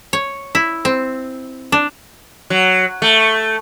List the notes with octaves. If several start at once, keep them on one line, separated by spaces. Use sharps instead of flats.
C#5
E4
C4
D4
F#3
A3